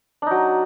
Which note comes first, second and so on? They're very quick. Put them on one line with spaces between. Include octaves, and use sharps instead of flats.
D4 D#4 F#3